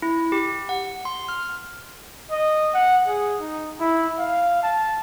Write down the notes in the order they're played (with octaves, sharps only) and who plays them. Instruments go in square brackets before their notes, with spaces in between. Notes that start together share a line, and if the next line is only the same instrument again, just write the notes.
[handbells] E4
G4
F#5
C6
F6
[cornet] D#5
F#5
G#4
D#4
E4
F5
A5